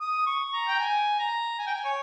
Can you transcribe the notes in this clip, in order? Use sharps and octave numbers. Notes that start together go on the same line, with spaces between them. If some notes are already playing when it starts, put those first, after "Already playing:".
D#6
C#6
A#5
G5
G#5
A#5
G#5
G5
G#5
C#5